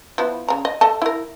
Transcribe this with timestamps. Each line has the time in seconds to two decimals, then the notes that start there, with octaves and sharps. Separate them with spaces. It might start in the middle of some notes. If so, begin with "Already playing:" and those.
0.18 F3 B3 E4
0.48 C#3 A#5
0.65 D#5
0.81 A4 D#5 A5
1.02 E4 A#4